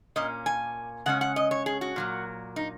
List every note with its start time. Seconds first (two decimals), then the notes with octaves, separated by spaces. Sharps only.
0.16 A#2 A#3 C#4 D#5
0.46 G#5
1.06 C#3 G#3 C#4 F#5
1.21 F#5
1.36 D#5
1.51 C#5
1.66 G#4
1.81 F#4
1.96 A#2 F#3 A#3
2.56 D#4